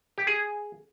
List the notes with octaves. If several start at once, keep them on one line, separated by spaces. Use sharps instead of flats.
G4
G#4